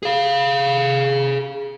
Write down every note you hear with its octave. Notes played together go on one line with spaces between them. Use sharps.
G#4 F5